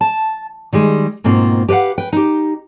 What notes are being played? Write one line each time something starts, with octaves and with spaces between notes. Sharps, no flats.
A5
D#3 G3 G#3
G#2 B2 A#3 C4 F4
G4 B4 D#5 F5 F#5
B4 G5
D#4 G4